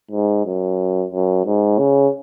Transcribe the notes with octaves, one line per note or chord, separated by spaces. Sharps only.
G#2
F#2
F#2
G#2
C#3